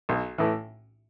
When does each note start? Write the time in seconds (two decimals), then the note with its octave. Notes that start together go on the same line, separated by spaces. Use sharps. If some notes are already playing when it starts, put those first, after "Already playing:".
0.09 B1
0.38 A2 E3